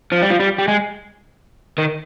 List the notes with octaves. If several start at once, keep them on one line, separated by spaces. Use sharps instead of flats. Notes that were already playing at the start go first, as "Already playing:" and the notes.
F3
G3
F3
G3
G3
G#3
D#3